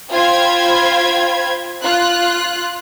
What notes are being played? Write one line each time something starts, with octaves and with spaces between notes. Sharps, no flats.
F4 C5 G5 B5 G#6
F4 F#6